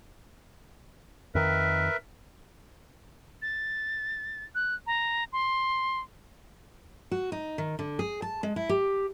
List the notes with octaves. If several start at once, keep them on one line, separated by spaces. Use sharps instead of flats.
F2 D#3 A#4 B4 E5
A6
F#6
A#5
C6
F#4
D#4
D#3
D3
G#4
A5
G#3
E4
G4